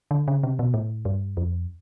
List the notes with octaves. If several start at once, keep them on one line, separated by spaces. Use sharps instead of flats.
D3
C#3
C3
B2
A2
G2
F2